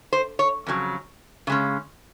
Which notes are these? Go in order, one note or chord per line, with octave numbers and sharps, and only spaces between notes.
C5
C#5
F2 C#3 F#3
C#3 G#3 C#4